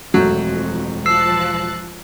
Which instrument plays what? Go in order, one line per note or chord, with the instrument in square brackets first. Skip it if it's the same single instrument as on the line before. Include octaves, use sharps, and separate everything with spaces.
[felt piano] E1 A3 G6 [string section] F2 [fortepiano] F#3
[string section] F3 A5 F#6 [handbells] E6 C7